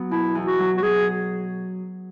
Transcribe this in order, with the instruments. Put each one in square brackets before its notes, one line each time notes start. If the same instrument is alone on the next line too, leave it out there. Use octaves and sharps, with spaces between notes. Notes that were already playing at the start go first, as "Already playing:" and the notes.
Already playing: [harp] F#3 B3
[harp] B2 [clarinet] E4
[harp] E2
[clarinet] F#4
[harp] F#3
[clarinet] F#4
[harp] F#3 [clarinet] G#4